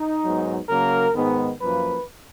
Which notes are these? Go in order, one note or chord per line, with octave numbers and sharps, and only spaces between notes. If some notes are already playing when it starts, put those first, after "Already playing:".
Already playing: D#4
G#2 F#3 B3
C#3 F#3 A#3 A#4
G#2 D#3 G#3 B3
F#2 F3 A#3 B4